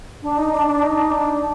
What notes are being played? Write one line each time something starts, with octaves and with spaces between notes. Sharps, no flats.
D4
D#4
D4
D4
D#4
D4